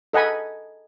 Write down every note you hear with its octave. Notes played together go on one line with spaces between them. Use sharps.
A4 D#5 F#5 G#5 B5